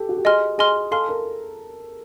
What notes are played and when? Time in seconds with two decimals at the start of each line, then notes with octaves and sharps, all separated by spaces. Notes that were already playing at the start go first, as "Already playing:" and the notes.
Already playing: G4 A4
0.09 F#4
0.17 G4
0.25 G#4 D#5 G#5 C6 F6
0.58 G#4 D#5 G#5 C6 F6
0.91 A4 F5 G#5 C6 F6
1.09 A#4